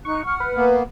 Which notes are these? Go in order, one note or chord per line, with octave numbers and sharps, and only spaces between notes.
D#4 C#6 F#6
F#5 F6
B4
A#3 B3